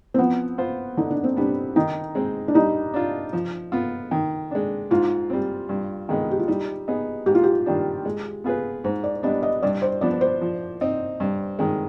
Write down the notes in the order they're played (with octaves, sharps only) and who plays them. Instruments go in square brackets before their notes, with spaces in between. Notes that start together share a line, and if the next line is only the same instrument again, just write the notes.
[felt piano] C4
[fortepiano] F3 [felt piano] B3
[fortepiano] B3 F4 C5
[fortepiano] D3 [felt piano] D#4
[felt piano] D4
C4
[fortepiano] G3 B3 [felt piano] D4
[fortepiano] D#3 [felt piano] D#4
[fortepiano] G#3 C4
[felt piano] D4
[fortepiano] G3 [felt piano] D#4
[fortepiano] D4 F4
F3
B3 F4
D#3
G#3 D4
[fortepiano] G#2 [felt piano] F4
[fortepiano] G3 C4
G2
D#3 G#3 B3 D#4
[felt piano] G4
F4
[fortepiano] G3 [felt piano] D#4
[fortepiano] B3 D#4 G#4
[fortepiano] G#2 [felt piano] G4
[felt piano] F4
G4
[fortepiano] D#3 G3 D4
G#3
B3 F4 G#4 B4
[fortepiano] G#2 [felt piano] C5
[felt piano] D5
[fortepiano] G3 B3 D4 [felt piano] D#5
[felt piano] D#5
[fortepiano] G2 [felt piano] D5
[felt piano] C5
[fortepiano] F3 B3 D4 [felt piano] D5
[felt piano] C5
[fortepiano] F3
C4 D#4
G2
D#3 G#3